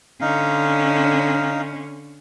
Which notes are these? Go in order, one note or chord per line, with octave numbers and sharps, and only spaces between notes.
D3 C#4 D#4 F5